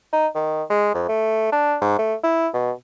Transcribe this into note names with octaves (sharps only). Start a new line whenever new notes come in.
D#4
D#3
G#3
F2
A3
D4
G#2
A3
E4
B2